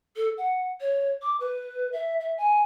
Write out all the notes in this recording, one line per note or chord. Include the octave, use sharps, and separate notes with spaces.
A4
F#5
C#5
D6
B4
E5
E5
G#5